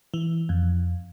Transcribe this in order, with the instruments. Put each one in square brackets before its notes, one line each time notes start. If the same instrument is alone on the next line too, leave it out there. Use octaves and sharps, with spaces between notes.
[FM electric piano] E3
F2